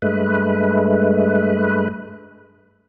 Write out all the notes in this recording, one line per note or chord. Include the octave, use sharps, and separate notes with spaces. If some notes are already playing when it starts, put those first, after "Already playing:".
G2 G#3 A3 B4